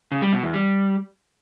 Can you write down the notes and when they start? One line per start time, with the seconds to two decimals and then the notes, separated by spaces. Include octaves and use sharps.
0.12 C#3
0.22 G3
0.33 B2
0.43 E2
0.54 G3